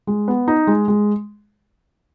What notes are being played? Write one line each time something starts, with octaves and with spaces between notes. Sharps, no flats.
G#3
B3
D#4
G#3
G#3